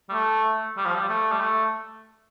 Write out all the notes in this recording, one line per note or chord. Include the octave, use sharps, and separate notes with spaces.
G3
A3
G3
F3
G3
A3
G3
A3